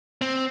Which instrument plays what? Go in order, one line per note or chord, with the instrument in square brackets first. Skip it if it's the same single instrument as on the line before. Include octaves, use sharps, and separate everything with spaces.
[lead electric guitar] C4